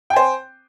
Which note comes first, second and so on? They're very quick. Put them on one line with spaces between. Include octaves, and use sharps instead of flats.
G5 G#5 C5